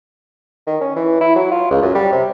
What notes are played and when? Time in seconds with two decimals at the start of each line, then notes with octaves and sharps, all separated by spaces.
0.67 D#3
0.81 C#4
0.96 E3
1.21 E4
1.36 F#3
1.52 F4
1.71 C#2
1.82 F#2
1.95 G3
2.12 C3